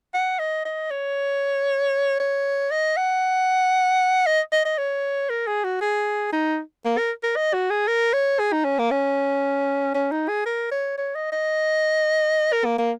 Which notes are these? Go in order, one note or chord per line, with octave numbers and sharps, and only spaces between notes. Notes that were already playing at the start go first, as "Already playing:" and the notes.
F#5
D#5
D#5
C#5
C#5
D#5
F#5
D#5
D#5
D#5
C#5
A#4
G#4
F#4
G#4
D#4
A#3
A#4
A#4
D#5
F#4
G#4
A#4
C#5
G#4
D#4
C#4
A#3
C#4
C#4
D#4
G#4
A#4
C#5
C#5
D#5
D#5
A#4
A#3
A#3